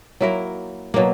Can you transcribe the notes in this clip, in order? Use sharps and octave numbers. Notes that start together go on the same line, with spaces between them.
F#3 A#3 E4 A#4
B2 F#3 A#3